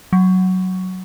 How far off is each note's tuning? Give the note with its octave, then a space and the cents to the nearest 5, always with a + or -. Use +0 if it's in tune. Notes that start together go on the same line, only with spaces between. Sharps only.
F#3 +5